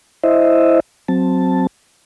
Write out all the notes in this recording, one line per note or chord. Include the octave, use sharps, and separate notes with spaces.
E4 C5 D#5 E5
F#3 C4 A5